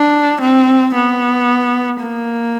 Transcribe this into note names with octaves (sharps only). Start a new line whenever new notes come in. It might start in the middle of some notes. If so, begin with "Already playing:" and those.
Already playing: D4
C4
B3
A#3